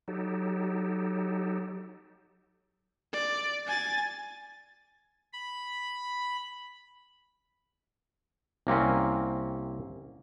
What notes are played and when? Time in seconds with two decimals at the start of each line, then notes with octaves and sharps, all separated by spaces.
0.08 F#3 D#4 G4 A4
3.13 D5
3.66 G#5 A6
5.33 B5
8.67 C2 A#3 C4 C#4